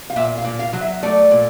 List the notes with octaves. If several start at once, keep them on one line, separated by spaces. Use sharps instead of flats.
F5
A#2 E5
F5
A#2
F5
F#3
E5
A3 D5
A#2